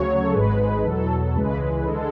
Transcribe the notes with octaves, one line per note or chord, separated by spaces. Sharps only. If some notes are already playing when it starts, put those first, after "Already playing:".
Already playing: D2 C#3 F#3 C#5
A4
G#1 G#2 G#3 B4
E2 B2 F#3 A4
C#2 C#3 E3 G#3 B4
D3 G#3 A4